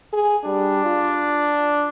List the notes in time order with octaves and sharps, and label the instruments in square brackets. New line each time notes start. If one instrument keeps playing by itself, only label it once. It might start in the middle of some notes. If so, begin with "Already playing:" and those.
[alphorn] G#4
[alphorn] G3 [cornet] D4
[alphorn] F4